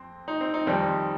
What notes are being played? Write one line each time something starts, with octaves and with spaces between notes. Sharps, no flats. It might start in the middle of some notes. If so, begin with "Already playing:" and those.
Already playing: F2 C4
D#4
C4
D#4
F2 D#3 G3 C4